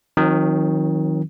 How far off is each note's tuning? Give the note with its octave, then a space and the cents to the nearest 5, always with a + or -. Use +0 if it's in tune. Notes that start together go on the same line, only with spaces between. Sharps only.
D#3 +20 F#3 -25 C4 +45